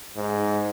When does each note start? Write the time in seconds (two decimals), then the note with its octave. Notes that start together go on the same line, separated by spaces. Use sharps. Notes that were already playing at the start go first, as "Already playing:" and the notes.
0.16 G#2